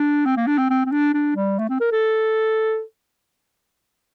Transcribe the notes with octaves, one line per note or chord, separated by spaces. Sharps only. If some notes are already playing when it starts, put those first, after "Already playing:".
Already playing: D4
C4
A#3
D4
C4
C4
C4
D4
D4
G3
A3
C4
A#4
A4